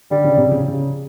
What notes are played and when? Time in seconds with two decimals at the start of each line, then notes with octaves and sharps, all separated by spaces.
0.11 D3 G3
0.24 C#3
0.37 C3
0.51 C#3
0.68 C#3